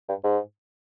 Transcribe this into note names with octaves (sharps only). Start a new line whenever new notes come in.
G2
G#2